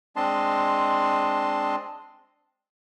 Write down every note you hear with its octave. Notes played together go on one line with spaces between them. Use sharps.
G#3 C4 D4 D#5 A5 C6